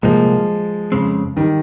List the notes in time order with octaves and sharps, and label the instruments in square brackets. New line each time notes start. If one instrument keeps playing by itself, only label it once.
[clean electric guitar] C2 A#2 G3 A#3 [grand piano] F3 G#3
[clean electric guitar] F2 C#3 G#3 C4
[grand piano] D#3 G3